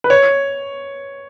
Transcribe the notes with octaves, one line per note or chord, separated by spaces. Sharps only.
B4
C#5